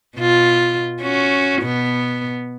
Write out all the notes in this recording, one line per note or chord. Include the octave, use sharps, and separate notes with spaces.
B2 F4
C#4 F#4
B2 B3